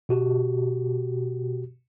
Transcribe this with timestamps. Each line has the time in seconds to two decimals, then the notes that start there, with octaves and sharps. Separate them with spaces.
0.09 B2 F#4 G4